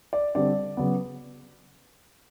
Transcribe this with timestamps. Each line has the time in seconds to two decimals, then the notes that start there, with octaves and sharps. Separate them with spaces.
0.13 D5
0.35 D3 G3 C4 D5
0.77 C#3 F#3 B3